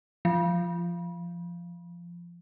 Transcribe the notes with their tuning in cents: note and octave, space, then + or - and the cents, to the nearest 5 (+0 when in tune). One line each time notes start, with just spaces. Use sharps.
F3 -15